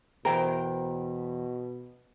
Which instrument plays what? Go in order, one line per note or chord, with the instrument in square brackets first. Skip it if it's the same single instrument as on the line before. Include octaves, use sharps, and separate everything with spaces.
[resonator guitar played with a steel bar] E2 G5 A#5 [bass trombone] B2 [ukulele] A#4 [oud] C5